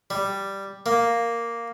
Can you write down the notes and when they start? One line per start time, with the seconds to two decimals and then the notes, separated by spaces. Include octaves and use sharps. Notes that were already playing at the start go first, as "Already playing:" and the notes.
0.10 G3
0.86 A#3